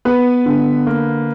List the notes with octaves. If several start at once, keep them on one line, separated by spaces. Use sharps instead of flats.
B3 B4
D3
A#3